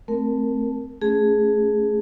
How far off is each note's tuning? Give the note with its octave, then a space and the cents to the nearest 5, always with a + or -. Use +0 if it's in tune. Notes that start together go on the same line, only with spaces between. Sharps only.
A3 +0 C4 +0 A#4 +0
A3 +0 C#4 +0 G#4 +0